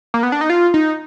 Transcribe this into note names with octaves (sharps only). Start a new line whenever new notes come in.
A#3
B3
D4
D#4
F4
D#4